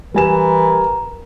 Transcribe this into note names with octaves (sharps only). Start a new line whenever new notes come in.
E3 G3 A#4 G#5 E7